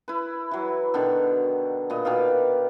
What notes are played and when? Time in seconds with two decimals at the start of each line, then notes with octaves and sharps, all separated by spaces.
0.08 E4 B4
0.51 E3 F#3
0.94 B2 D3 D#3
1.90 A#2 B4 D#5
2.05 B2 D#3 D5 F5